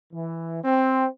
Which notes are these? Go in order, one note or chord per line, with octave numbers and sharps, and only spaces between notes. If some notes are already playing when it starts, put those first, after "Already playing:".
E3
C4